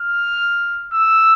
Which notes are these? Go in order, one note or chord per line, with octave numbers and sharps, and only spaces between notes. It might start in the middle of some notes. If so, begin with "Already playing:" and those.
Already playing: F6
E6